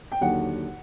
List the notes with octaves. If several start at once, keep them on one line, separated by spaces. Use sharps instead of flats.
G5
D#2 D3 F#3 F#5